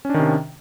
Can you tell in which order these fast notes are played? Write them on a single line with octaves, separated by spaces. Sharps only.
C#4 D4 D#3 C3